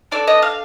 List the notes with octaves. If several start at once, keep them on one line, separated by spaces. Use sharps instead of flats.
D4 A4 D5
D#5
F5